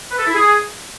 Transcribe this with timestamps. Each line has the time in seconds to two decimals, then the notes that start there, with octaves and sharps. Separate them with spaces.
0.10 B4
0.18 A4
0.26 E4
0.34 G#4